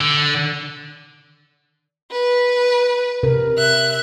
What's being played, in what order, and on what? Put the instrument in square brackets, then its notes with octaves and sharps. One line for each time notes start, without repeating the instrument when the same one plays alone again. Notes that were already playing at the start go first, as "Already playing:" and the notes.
[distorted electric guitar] D3
[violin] B4
[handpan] C3 A#4
[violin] E5 F#6